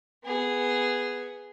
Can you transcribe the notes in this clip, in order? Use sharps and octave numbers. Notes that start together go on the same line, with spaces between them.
B3 G#4